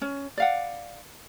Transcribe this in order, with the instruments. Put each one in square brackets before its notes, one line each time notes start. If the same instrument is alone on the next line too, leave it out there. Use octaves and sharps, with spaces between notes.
[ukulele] C#4
D5 F5 F#5